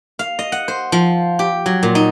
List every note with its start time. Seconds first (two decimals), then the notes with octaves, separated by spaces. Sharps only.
0.19 F5
0.39 D#5
0.52 F#5
0.68 C5
0.92 F3
1.39 G4
1.66 F#3
1.83 A#2
1.95 D#4